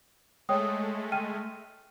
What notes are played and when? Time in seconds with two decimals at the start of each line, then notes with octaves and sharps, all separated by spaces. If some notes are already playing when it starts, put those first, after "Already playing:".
0.49 G#3 A3 C#5 G5 D#6
1.12 G5 F6 D#7